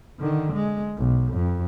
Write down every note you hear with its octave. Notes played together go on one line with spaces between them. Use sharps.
D3 D#3
G#3
B1
F2